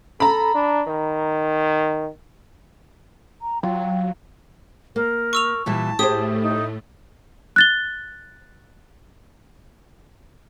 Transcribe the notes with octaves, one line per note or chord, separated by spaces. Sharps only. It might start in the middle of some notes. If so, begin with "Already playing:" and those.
A4 A#5 B5
D4
D#3
A#5
F#3 F4 G5
A#3 A#4
C#6 E6 F7
A#2 E3 G3 A5
A2 A3 G4 G#4 C5 D#6
D#4
F#6 A6 G7